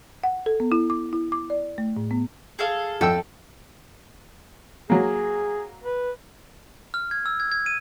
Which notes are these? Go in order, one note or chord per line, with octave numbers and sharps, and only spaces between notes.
F#5
A4
B3
E4
D6
E4
D6
D5
A3
A2
B3
G#4 A4 F5
F2 A4 G5 E6
F#3 A#3 G#4
B4
F6
G#6
E6
G#6
G#6
D#7